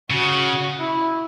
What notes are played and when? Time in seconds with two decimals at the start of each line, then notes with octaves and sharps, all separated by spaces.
0.11 C#3 F#4
0.80 E4